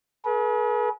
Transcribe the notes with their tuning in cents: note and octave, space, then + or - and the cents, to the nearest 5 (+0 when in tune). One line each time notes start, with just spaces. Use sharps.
G#4 +40 B4 -40